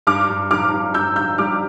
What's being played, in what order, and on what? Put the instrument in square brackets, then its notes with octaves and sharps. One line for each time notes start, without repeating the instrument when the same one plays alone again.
[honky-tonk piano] G2 D6 F6
G2
G2 D6 F6
G2
G2 E6 G6
G2 E6 G6
G3 D6 F6